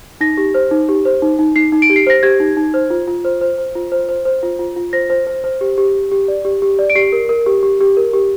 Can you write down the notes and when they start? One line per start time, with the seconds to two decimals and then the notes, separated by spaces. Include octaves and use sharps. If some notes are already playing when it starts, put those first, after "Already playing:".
0.21 D#4 A#6
0.37 G4
0.54 C5
0.71 D#4
0.89 G4
1.05 C5
1.22 D#4
1.39 D#4
1.56 D#4 C7
1.72 D#4
1.82 D7
1.90 G4
1.96 C7
2.07 C5 A#6
2.23 G4 G#6
2.40 D#4
2.57 D#4
2.74 C5
2.90 F4
3.08 F4
3.25 C5
3.41 C5
3.58 C5
3.75 F4
3.92 C5
4.09 C5
4.25 C5
4.43 F4
4.59 F4
4.76 F4
4.93 C5 A#6
5.10 C5
5.27 C5
5.44 C5
5.61 G4
5.78 G4
5.94 G4
6.12 G4
6.28 D5
6.45 G4
6.62 G4
6.79 D5
6.90 D7
6.96 G4 C7
7.12 A#4
7.29 A#4
7.46 G4
7.63 G4
7.81 G4
7.97 A#4
8.13 G4